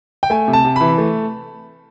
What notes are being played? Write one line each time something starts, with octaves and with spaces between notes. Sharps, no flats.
G5
A3 G#5
C3
A5
C3
E3 B5
A3